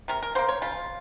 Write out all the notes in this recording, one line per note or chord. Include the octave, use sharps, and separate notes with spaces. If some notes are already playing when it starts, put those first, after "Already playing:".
C3 A#4
A#4
F#3 A#3 C5
C#5
C#3 F4